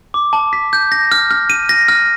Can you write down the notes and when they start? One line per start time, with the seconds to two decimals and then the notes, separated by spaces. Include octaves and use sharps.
0.14 D6
0.33 A5
0.53 B6
0.73 G6
0.92 A#6
1.12 F6
1.31 F6
1.50 D#7
1.69 A#6
1.88 F6